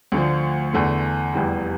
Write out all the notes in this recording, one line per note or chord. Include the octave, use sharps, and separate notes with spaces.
D2 D3 F3
E2 D3 A3
F1 E2 E3 G3